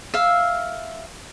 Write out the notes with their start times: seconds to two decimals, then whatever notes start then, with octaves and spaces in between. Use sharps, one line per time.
0.14 E5 F5